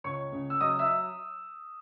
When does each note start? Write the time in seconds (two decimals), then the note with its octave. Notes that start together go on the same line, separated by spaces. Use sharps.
0.04 C#2 C#5 C#6
0.32 C#3
0.50 E6
0.61 F#3 D#5 D#6
0.79 E5 E6